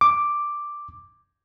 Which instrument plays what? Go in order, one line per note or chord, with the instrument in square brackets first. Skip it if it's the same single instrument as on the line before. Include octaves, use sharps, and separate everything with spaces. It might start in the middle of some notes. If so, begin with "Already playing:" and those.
[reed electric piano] D6